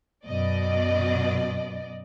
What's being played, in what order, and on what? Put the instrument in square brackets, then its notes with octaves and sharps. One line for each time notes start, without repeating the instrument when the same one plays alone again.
[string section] F#2 B2 D5 D#5